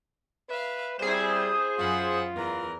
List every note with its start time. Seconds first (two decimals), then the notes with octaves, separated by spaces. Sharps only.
0.50 B4 E5 F5
0.99 G3 C4 E4 G#4 C5
1.78 F#2 F4 F#5 B5
2.34 E2 E3 A#4